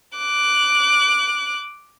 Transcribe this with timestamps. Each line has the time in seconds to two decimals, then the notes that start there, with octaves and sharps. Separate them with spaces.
0.18 D6 F#6